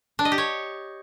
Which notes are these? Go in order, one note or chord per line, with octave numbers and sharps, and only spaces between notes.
D4
D#5
G4
C#5